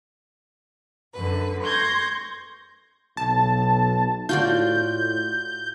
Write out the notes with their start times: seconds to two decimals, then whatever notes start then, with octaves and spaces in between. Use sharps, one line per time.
1.15 F#2 D3 B4
1.63 C6 C#6 G6 G#6 A#6
3.17 B1 A5
4.29 A2 F4 F#4 D5 G6